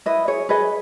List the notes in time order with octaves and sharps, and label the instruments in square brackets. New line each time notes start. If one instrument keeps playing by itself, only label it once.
[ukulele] E4 B4 D#5
G#4 C#5
G#4 B4 D#5